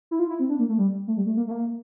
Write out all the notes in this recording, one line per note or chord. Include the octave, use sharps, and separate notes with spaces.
E4
F4
E4
C4
D4
A#3
A3
G3
A3
G3
A3
A#3
A3
A#3